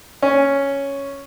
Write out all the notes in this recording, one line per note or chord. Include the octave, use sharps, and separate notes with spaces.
C#4